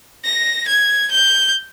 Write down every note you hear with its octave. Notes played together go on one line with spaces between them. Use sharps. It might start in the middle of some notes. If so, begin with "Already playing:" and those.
A#6
G#6
G6